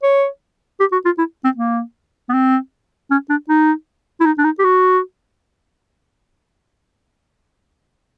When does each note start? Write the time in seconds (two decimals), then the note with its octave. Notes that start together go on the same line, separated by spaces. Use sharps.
0.03 C#5
0.80 G4
0.92 F#4
1.05 F4
1.18 E4
1.44 C4
1.57 A#3
2.29 B3
2.34 C4
3.11 C#4
3.30 D4
3.49 D#4
4.20 E4
4.26 D#4
4.38 D4
4.44 D#4
4.59 G4
4.64 F#4